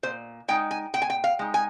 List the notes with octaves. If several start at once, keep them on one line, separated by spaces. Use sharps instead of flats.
A#2 C5
G#3 D#4 G5
G#5
A#2 G5
G#5
G5
F5
G#3 D#4
G#5